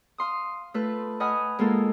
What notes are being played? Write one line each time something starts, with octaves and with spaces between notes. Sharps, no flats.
F5 C6 D#6
A3 F4 A4 B4
D#5 F#5 G#5 B5 D#6 F6
G#3 A#3 F4 A4 A#4